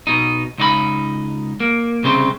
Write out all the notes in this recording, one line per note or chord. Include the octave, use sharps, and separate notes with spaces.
B2 D#4
C#2 D#4 F#4 B5
A#3
C2 C#3 C4 C5